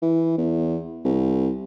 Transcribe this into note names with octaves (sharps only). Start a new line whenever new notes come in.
E3
E2
C2